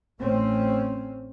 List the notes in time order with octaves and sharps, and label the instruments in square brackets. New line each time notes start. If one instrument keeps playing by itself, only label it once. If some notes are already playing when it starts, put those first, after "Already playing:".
[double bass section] A1 A3 C4 C#4